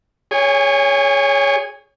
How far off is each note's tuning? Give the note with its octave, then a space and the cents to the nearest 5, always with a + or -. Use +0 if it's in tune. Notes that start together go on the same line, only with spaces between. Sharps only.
G#4 -5 C#5 +10 G#5 -40